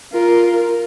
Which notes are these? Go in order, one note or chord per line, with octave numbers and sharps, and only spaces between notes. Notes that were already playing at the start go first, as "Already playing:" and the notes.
F4 A#4